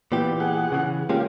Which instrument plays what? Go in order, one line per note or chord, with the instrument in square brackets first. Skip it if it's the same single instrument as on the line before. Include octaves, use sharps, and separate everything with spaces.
[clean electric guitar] A#2 E3 G4 [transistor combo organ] B3
[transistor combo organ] G#4 F#5
[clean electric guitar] C#3 E3
[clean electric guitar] G#3 A#3 C#4 [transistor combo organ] F4 G4